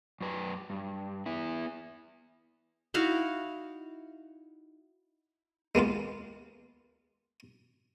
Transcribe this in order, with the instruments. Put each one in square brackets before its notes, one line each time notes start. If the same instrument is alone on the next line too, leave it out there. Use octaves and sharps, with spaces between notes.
[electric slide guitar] F#2 B4
G2
B3 E4
[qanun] D#4 E4 F#4 F5
[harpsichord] G#3 A#3 B3 F4